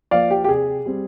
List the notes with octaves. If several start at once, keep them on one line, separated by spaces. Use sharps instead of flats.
F3 A#3 D5 F5
G4
G4
C3 G#4
G3 C4